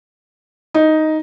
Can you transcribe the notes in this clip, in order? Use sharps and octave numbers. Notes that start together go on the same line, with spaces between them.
D#4